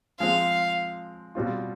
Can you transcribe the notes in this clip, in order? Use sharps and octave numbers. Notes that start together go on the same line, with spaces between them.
F3 G#3 C4 F5
B2 G3 C4 F4